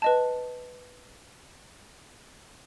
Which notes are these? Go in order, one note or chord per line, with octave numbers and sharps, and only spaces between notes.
B4 D#5 A5